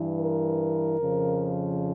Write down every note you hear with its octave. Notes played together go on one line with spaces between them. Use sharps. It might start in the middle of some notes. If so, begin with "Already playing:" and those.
Already playing: G2 E3
A#4
F2 C#3 F3